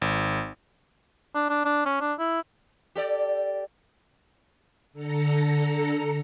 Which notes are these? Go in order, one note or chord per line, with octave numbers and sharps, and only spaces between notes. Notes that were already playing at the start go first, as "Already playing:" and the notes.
G#1
D4
D4
D4
C#4
D4
E4
G4 A4 D5
D3 A4 A#5 C#7